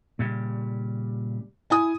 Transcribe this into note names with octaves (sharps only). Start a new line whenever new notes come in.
A#2 C#3 G3
E4 G#5 D#6